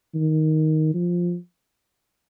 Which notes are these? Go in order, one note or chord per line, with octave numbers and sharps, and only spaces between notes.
D#3
F3